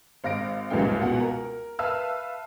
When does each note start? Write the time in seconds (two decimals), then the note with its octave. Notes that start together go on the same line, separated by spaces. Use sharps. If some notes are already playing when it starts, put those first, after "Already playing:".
0.24 G#1 F5 A#6 D7
0.70 C2 F#2 E3 G#3 F5 G5
1.00 C#2 B2 F#5
1.20 A#4
1.79 B4 E5 F5 A5 E6 F6